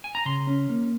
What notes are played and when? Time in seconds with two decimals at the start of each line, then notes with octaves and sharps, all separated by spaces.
0.04 G#5
0.15 A#5
0.25 C#3 C6
0.47 C#4
0.69 A#3